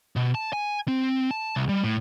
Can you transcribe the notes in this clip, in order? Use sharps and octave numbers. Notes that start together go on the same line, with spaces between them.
B2
A5
G#5
C4
A5
C2
G3
A2